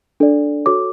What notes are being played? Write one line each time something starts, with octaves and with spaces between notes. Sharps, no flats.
D4 A4 D5
F#4 A4 C#5 D6